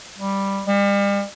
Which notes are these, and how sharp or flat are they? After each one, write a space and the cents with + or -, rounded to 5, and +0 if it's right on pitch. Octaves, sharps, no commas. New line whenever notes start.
G3 +5
G3 +40